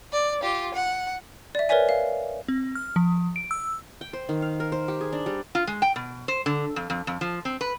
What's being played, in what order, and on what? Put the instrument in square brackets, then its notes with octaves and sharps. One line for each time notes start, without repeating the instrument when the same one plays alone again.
[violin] D5
F4 G4
F#5
[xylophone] D5 E5
A#4 B4 C#5 D5 E5 G#5
F5
[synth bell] C4
F6
F3
D7
E6
[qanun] G5
C5
D#3
F5
A#4
C5
G4
G#4
D4
G3
[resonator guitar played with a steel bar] F4
G#3
G5
B2
C5
D3
F2
F2
F2
F3
C4
B4